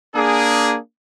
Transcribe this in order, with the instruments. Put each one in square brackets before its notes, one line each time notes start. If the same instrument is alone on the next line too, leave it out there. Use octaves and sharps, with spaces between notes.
[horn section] A#3 D4 G#4